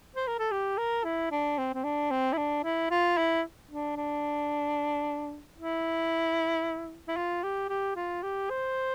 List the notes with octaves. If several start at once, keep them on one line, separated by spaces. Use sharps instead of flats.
C5
A#4
A4
G4
A#4
E4
D4
C4
C4
D4
C4
E4
D4
E4
F4
E4
D4
D4
E4
E4
F4
G4
G4
F4
G4
C5